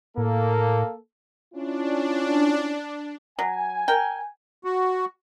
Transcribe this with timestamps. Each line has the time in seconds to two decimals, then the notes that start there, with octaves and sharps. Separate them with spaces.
0.17 A2 A#3 A4
1.53 C#4 D4 E4 F4
3.39 F#3 G#5
3.88 A#4 G5
4.64 F#4